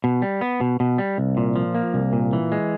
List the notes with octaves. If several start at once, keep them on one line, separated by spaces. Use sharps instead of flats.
B2
G3
B3
B2
B2
G3
C2
A#2
F3
A#3
C2
A#2
E3
G#3